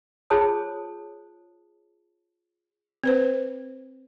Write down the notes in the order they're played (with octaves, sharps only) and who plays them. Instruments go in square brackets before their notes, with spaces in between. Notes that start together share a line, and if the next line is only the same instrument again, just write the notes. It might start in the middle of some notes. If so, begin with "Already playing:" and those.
[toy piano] F4 G#4 C5 C#5 A5 D#6
[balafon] C4 B4 C5